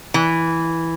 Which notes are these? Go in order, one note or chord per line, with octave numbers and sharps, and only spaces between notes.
E3